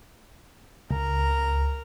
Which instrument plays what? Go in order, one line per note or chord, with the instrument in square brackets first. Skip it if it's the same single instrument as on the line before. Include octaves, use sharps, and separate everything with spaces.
[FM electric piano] C#2 [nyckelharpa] A#4 A#5